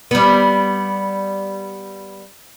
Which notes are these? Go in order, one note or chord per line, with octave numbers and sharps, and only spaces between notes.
G3 B3